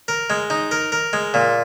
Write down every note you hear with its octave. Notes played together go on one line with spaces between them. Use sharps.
A#4
G#3
D#4
A#4
A#4
G#3
A#2